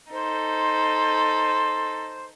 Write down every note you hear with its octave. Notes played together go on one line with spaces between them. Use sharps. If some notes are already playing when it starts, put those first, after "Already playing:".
D#4 A4 C5